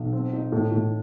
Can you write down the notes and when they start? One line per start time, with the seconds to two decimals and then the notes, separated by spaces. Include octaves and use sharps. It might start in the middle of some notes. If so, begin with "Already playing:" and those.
Already playing: B1
0.13 C4
0.33 D#4
0.52 A2
0.71 A2